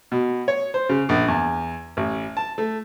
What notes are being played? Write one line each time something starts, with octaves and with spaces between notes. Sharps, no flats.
B2
C#5
C5
C#3
A#1
E2
A1
A5
A3